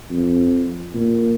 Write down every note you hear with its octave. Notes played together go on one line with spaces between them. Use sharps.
F2
A#2